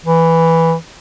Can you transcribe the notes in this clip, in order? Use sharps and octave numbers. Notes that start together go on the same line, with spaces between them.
E3